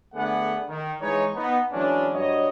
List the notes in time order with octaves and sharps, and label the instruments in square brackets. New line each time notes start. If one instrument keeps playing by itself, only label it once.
[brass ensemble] D3 A3 B3 G#4 D5 F#5
D#3
E3 G#3 D#4 B4 C#5
B3 D#4
E3 F#3 G#3 C#4 D4
G2 F#3 C#5 D#5